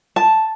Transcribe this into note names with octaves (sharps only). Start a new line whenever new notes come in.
A5